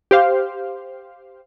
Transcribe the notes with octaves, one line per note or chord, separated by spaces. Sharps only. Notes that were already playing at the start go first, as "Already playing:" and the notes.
G4 C5 F5